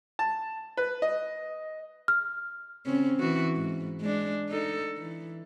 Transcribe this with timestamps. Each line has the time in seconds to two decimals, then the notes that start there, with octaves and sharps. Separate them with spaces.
0.19 A5
0.77 B4
1.02 D#5
2.08 F6
2.86 C#3 C4 C#4
3.17 E3 F#4
3.55 G#2
4.01 G#3 D4
4.50 D#4 A4
4.97 E3